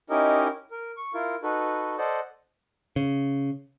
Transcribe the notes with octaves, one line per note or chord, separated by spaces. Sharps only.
C#4 D#4 E4 G4 A#4 D#5
A#4
C#6
E4 F4 A#4
D#4 F#4 A4 B4
A4 C5 D5 D#5 F#5
C#3